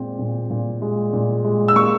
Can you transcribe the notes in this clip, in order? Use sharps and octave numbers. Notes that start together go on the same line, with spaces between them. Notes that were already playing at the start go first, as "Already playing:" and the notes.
Already playing: A#2 G#3 C4
A#2
A#2
G#3
A#2
G#3
E6
A#3 C#6